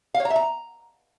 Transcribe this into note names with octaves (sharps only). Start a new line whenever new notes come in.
F5
C#5
A#5
E5
A#5